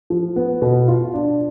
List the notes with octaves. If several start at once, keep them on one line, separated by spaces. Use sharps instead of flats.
F3
B3
B2
F4
D4